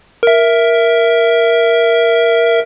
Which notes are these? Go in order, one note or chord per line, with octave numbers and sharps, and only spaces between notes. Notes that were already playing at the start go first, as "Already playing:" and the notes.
A#4 E5